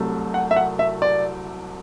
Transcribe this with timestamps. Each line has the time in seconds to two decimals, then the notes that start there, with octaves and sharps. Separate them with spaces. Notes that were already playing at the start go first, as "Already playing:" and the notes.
Already playing: C2 C3 F#3 A3
0.34 F#5
0.51 E5
0.56 F#5
0.79 E5
1.02 D5